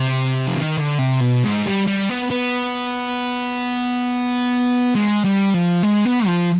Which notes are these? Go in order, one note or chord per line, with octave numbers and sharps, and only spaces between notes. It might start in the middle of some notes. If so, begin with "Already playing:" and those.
Already playing: C3
F3
D#3
D3
C3
B2
G#2
G3
G3
B3
B3
G#3
G3
F3
G#3
B3
F3